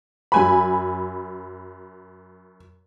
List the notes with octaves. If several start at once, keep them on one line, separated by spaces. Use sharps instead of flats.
F#2 G#5 B5